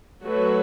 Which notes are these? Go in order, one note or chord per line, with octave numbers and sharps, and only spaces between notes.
F#3 A3 F#4 B4